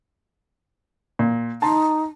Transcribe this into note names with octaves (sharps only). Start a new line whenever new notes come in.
A#2
D#4 A5 A#5 C6